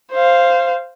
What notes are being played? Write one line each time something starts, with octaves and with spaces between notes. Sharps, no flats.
C5 F5